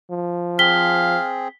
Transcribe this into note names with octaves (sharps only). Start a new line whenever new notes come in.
F3
C4 G#4 F5 B6 G7